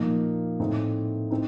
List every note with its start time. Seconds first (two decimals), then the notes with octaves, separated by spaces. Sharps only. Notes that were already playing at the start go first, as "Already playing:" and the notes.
Already playing: A#2 F3 A#3 D#4
0.60 A2 A3 C4 D#4
1.31 C4 D#4